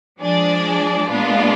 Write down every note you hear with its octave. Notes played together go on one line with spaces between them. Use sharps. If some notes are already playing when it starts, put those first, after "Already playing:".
F3 G#3 D4 G#4 D5
A#2 G#3 B3 D4 F4